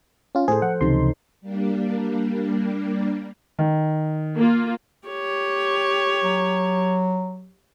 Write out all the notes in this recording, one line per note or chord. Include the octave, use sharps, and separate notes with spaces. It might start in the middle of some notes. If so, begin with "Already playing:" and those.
C#4 F4
A2 G#4 A4 C5
F3 F#5
C#2 C3 E3 C#4 D#4 C6
G3 A#3 D4
D#3
A#3 F4
G4 C#5
F#3